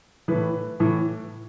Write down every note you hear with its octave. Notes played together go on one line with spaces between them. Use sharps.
A2 E3 B4
A2 E3